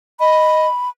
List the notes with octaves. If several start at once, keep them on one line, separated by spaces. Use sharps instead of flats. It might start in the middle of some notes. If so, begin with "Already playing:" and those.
D#5 B5